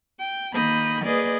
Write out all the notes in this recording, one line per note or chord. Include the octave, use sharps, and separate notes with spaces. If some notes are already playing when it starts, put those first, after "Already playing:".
G5
D#3 A#3 B5 D#6 G6
A#3 G#4 B4 D5 D#5